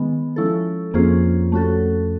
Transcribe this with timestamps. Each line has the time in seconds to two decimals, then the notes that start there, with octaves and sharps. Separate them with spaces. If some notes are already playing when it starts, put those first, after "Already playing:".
Already playing: D#3 G#3 B3
0.36 F3 G#3 C#4 E4 A4
0.94 F2 A#3 C#4 F4 G#4 C5
1.52 A3 C#4 F#4 A4